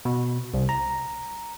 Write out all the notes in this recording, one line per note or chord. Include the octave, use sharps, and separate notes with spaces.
B2
C2
A#5